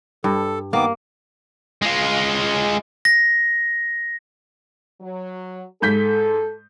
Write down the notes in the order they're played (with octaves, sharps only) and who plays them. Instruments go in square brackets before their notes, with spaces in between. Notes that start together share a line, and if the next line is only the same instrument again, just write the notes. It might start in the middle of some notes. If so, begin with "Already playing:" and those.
[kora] G2 [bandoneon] A4
[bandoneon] D#3 B3 D6 [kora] A#3
[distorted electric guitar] G#3 F4
[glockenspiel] A#6
[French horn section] F#3
[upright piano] G#2 G6 B6 [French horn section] A4